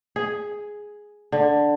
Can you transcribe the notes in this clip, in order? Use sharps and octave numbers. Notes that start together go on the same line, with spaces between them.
G#4
D3